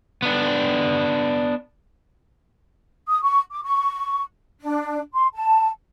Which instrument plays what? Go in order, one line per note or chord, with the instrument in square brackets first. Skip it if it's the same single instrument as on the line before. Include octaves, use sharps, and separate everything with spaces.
[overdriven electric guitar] B3 D4
[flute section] D#6
C#6
D6
C#6
D4
C6
A5